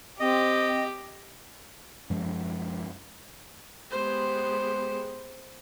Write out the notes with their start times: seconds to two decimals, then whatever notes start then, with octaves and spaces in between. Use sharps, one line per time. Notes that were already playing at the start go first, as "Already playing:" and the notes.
0.20 C4 G4 D#5
2.10 F#2 F3 G#3
3.91 G#3 B3 G4 C5